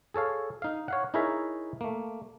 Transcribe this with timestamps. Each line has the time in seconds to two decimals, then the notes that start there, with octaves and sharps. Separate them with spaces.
0.14 G#4 A4 C#5 F5
0.62 D#4 F5
0.88 C#5 F5 F#5
1.14 D#4 E4 G#4 A#4 C#5 E5
1.81 A3 A#3